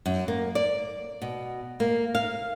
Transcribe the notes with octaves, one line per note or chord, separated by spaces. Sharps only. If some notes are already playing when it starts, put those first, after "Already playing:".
F#2
A#3
D5
B2
A#3
F5